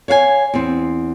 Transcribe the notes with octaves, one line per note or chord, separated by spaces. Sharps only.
C#5 F5 F#5 G#5
E2 C4